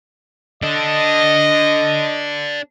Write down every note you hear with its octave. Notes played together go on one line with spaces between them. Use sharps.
D4 A4 D#5